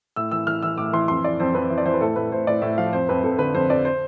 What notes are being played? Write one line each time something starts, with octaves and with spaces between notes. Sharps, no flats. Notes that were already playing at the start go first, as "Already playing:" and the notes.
A2 E6
E3 E6
E3 F6
E3 E6
A2 D6
E3 C6
F2 C6
E3 D5
F2 C5
F2 B4
E3
D5
E3 C5
B4
A2 A4
A2 B4
A2 C5
A2 D5
A2 E5
F3 F5
F2 C5
F2 B4
F2 A4
D3 B4
F2 C5
F2 D5
C5